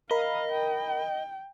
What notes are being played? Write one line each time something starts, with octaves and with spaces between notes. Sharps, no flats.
A#4 D#5 F5 B5
G5